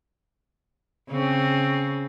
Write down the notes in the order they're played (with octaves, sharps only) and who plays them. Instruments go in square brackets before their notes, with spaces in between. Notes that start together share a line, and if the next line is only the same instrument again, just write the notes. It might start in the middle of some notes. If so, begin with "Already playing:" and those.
[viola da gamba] C#3 C4